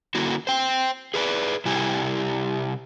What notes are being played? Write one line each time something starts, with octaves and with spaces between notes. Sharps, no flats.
D3 A#3 E4 F#4
C5 G5
G#4 B4 C#5 D5
C3 G3 E4 G4 G#5